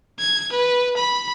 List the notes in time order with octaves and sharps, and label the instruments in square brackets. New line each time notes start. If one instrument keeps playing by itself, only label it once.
[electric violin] G#6
B4
B5